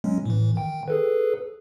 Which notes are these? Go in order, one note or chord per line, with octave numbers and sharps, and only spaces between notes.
F#3 G#3 C#4
A2 E3
D#3 G5
G#4 A4 B4